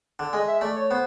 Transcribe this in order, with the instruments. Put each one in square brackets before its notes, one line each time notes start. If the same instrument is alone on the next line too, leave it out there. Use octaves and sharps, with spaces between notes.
[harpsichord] D3
[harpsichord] G#3 [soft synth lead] D#5
[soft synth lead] E5
[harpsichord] A3 [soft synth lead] D5
[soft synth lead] C#5
[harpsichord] B3 [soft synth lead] C5